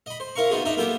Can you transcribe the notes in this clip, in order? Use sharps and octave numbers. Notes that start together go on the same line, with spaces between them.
D#5 B5
C5
E4 A#4 F5 A#5 C#6
B3 D#4 F4 F#4 G#4
D4 D#4 D#5 E5 A#5
A#3 B3 F4 G4 A4 G5